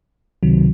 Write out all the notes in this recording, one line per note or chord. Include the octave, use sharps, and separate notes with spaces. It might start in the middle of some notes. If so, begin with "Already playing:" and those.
C#2 C3 D#3 F#3